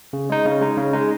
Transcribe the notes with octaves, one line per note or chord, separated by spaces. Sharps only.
C#3
G#3 D#4
C#3
G#3 D#4
C#3
G#3 D#4